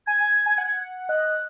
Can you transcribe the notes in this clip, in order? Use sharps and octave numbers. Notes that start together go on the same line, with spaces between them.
G#5 G#6
G#5
G#5
F#5
D#5 F#6